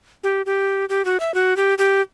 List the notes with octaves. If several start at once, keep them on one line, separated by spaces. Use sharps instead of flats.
G4
G4
G4
F#4
E5
F#4
G4
G4